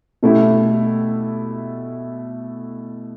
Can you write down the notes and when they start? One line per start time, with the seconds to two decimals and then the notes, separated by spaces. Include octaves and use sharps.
0.23 B2 A3 E4 G4